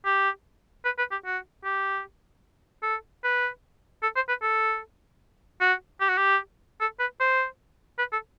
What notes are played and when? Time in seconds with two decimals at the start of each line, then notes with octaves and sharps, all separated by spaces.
0.05 G4
0.85 B4
0.98 B4
1.11 G4
1.25 F#4
1.64 G4
2.83 A4
3.24 B4
4.03 A4
4.16 C5
4.29 B4
4.42 A4
5.61 F#4
6.01 G4
6.09 F#4
6.17 G4
6.80 A4
7.00 B4
7.20 C5
7.98 B4
8.12 A4